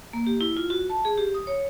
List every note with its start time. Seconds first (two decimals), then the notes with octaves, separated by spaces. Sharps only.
0.13 A#3
0.27 G4
0.41 E4
0.57 F4
0.70 F#4
0.90 A5
1.05 G#4
1.18 G4
1.34 D#6
1.47 C#5